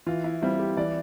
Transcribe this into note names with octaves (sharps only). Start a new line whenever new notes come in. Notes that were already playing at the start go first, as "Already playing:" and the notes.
E3 F4
E4
G3 C4 E4 F4
G4
E3 D5